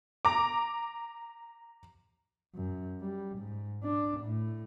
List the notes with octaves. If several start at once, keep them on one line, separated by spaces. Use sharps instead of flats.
A#5 D6
F#2
G3
G#2
D4
A2